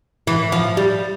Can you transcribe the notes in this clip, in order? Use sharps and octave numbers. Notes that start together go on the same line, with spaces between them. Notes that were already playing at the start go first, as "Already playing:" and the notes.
E3
F3
G3